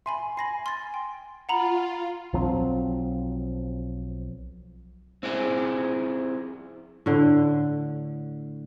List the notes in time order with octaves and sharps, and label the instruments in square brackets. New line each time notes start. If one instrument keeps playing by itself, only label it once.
[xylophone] E5 G#5 B5 [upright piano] C6
[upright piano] G#5 [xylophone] B5 A#6 C7
[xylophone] C6 A6
G5
[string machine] F4 [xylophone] F#5 A#5 B5
[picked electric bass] B1 F3 F#3 C4
[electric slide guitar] C4 E4 G#4
[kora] A2 D3